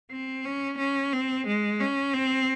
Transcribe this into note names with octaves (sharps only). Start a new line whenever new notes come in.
C4
C#4
C#4
C4
G#3
C#4
C4